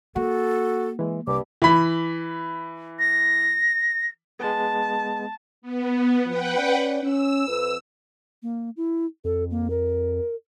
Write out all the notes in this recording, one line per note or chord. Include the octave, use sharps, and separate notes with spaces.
A#3 F#4 A4
E3 G#3
C2 G2 D6
E3 B5
A#6
G#3 B3 A5
B3
F3 B4 F#5 G5
C#4 D5
C#4 E6
F2 B4
A#3
E4
F2 A4
A#3
A#4